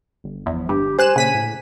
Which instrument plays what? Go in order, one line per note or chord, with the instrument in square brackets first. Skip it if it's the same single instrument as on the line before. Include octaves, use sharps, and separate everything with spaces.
[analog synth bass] G1
[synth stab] E2 [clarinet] F3
[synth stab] G2 [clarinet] G4
[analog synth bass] G3 [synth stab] C5 F#6 E7 [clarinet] G#5
[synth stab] A#1 B6 D#7 [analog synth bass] C#3
[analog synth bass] A2